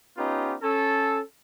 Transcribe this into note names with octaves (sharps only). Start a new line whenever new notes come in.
B3 C#4 D#4 F4 G4
C#4 A4